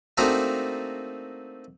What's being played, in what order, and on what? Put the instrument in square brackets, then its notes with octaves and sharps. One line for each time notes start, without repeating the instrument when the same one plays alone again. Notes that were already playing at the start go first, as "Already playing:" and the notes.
[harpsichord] A3 A#3 C4 D4 D#4 F#4